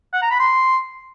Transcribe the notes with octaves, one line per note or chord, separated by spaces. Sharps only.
F#5
A#5
B5
C6